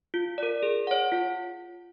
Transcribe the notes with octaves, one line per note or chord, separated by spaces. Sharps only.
F4
A#4 D5
G#4
C#5 F#5
F4